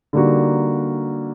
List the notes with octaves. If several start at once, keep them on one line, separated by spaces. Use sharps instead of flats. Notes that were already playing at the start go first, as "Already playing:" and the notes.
D3 G3 A#3 D#4 F#4